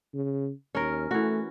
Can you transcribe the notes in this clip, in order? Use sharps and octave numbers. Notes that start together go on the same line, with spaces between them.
C#3
D#2 C#4 A#4
E3 A3 F#4